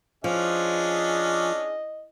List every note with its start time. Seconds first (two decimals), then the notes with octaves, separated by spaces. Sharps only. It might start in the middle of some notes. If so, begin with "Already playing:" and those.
0.24 F3 C#4 D4 G#4 D#5